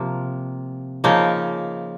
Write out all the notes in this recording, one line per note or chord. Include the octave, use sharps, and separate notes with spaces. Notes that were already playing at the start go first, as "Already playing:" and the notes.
Already playing: C3 F3 A#3
C#3 F3 A#3 D#4